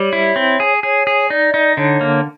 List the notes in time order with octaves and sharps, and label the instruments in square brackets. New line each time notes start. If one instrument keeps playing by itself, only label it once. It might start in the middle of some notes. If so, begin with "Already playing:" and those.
Already playing: [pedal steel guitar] G3 [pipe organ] C#5
[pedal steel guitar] E4
C4
G#4
[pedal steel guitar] G#4 [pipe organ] C#5
[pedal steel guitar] G#4
[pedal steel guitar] D#4 [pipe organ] D5
[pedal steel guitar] D#4
[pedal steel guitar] D3 [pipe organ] C#5
[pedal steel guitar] A#3